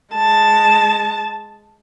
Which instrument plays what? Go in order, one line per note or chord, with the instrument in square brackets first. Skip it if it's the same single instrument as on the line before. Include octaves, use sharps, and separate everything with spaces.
[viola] G#3 A5